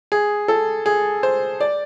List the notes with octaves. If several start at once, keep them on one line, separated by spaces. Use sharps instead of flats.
G#4
A4
G#4
C5
D5